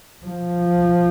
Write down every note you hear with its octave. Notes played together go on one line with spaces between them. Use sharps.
F3